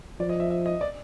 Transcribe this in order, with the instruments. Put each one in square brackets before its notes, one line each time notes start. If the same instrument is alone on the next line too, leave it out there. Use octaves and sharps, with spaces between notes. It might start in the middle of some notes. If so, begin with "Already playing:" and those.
[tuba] F3 [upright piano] D5
[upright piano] D#5
E5
E5
D#5
D5